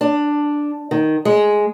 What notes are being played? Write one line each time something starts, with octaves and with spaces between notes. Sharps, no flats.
D4
D#3
G#3